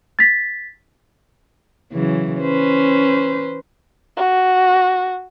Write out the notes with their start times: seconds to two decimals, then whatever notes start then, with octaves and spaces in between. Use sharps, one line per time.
0.19 A6 B6
1.93 C#3 E3 F#3
2.41 C#4 B4 C5
4.16 F#4